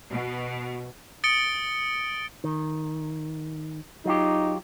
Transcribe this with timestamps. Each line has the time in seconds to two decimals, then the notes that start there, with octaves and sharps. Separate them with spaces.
0.10 B2
1.24 D#6 A6 C#7 D7 G7
2.44 D#3
4.05 F#3 D#4 F4 G4